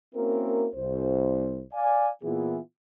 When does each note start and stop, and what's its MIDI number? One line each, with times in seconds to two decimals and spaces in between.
0.15 0.67 58
0.15 0.67 60
0.15 0.67 61
0.15 0.67 64
0.15 0.67 66
0.15 0.67 70
0.75 1.61 36
0.75 1.61 72
1.74 2.10 74
1.74 2.10 77
1.74 2.10 80
2.23 2.59 46
2.23 2.59 52
2.23 2.59 59
2.23 2.59 64
2.23 2.59 65
2.23 2.59 68